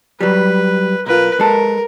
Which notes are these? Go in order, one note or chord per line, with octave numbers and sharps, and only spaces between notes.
F#3 G3 B4
B1 F4 A#4 B4
G#3 A4 A#4